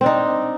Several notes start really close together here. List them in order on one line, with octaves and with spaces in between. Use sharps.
C4 D4 D#4